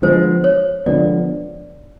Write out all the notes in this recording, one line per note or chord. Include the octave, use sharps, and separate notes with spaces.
D3 F3 G#3 B3 C5
C#5
D3 F3 G#3 B3 D5